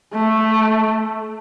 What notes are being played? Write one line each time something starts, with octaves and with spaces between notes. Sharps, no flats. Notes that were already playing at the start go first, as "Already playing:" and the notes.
A3